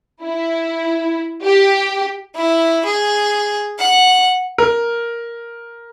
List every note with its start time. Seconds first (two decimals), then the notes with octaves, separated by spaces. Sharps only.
0.24 E4
1.44 G4
2.36 E4
2.85 G#4
3.79 F#5
4.58 A#4